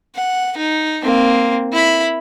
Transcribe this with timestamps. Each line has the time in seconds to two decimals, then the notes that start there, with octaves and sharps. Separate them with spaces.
0.16 F#5
0.57 D#4
1.03 A#3 C4
1.73 E4 B5